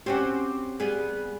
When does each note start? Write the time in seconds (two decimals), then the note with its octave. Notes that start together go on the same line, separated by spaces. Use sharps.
0.06 C4 C#4 F#4 G4
0.80 G3 B3 G#4